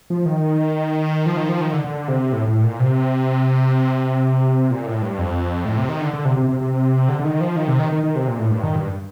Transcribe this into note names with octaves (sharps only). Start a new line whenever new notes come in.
F3
D#3
F3
D#3
F3
D#3
D3
D3
C3
A2
A2
A#2
C3
A#2
A2
G2
F2
A2
C3
D#3
D3
D3
C3
C3
C3
C3
D3
D3
D#3
F3
D#3
C3
D#3
D#3
D#3
C3
A#2
A2
G2
D#3
G2